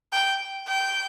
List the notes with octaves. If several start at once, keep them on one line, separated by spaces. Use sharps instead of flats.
G5
G5